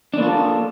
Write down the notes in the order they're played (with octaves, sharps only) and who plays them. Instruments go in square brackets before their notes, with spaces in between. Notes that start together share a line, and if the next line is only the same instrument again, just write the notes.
[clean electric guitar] D4
A#3
F4
A4